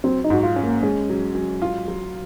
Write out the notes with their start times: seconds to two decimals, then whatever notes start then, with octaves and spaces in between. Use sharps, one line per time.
0.04 F#3 C4
0.24 D#4
0.30 G#2 F#4
0.43 F4
0.56 C#4
0.63 A#3
0.83 G#3 C#4
1.10 F#3
1.35 F#3
1.62 F4
1.88 F#3